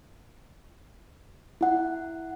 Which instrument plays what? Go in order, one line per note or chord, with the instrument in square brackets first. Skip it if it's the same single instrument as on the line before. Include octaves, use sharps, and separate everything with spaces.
[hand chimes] E4 F#5